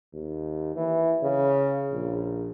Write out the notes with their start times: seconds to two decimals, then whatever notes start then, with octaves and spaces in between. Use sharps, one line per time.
0.13 D#2
0.76 E3
1.23 C#3
1.92 A#1